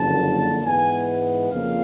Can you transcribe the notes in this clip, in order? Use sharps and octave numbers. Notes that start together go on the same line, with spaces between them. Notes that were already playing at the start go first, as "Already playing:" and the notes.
Already playing: F#1 F2 D3 F#3 A#3 A5
G#2 E3 G#3 B3 G#5
F2 C#3 F3 A#3 F5